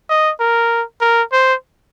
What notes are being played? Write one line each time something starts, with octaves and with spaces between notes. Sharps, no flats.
D#5
A#4
A#4
C5